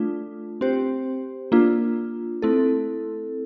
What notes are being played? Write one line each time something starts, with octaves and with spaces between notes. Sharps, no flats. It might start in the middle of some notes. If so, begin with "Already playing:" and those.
Already playing: A3 D4 F4
C4 G4 C5
A#3 D4 F4
A3 C4 E4 A4